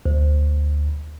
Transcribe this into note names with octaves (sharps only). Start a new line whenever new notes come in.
D2